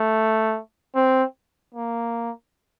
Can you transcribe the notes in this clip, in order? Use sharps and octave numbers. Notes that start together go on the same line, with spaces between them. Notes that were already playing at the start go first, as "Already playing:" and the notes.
Already playing: A3
C4
A#3